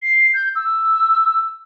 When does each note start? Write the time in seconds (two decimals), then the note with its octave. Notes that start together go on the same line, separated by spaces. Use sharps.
0.03 C7
0.34 G6
0.55 E6